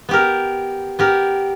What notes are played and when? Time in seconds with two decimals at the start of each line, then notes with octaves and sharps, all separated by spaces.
0.09 B3 G4 A#4
0.99 B3 G4 A#4